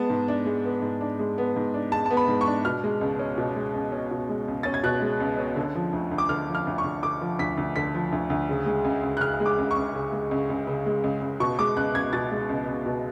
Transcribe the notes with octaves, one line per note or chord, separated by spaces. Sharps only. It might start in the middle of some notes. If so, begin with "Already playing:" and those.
Already playing: G#3 B3 A5
G#2
D4
G#3
B3
G#2
D4
G#3
B3
G#2
D4
G#3 A5
B3 A5
B5
G#2
C#6
D4
B2 F6
G#3
C#2
C#4
B2
G#3
C#2
C#4
B2
G#3
C#2
C#4 A6
G#6
B2 F#6
G#3
C#2
C#4
D3
F3
D2
D2
D6
D3 F6
F3
F6
D2
C#6
D2
D3 D6
F3
D2 B6
D2
D3 B6
F3
D2
D2
C#3
G#3
C#2
C#2
F#6
C#3 F6
G#3
D6
C#2
C#6
C#2
C#3
G#3
C#2
C#2
C#3
G#3
C#2
C#2
B2 C#6
G#3 D6
C#2 F#6
C#2 G#6
B2 A6
G#3
C#2
C#2
B2